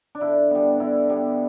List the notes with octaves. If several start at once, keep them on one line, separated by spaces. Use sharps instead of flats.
D4
D3 E4
G3 B3
D3 E4
G3 B3